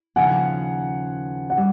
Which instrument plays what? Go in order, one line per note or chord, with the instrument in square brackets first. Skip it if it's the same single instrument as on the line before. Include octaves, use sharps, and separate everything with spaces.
[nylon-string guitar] D#2 C#3 F3 [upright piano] F#5 G#5
[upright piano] F#5
[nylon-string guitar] G3